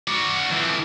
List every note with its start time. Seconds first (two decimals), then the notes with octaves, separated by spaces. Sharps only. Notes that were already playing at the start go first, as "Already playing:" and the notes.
0.08 F#4 D5
0.51 F2 E3